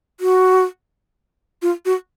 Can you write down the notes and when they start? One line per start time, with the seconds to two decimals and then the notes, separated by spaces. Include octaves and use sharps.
0.20 F#4
1.62 F4
1.85 F#4